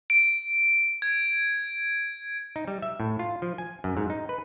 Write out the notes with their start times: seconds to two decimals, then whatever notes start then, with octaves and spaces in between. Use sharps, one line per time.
0.10 D7
1.02 G#6
2.56 D#4
2.68 G3
2.82 E5
3.00 A2
3.19 F4
3.42 F3
3.58 G#5
3.84 F#2
3.97 G#2
4.10 D#4
4.29 B4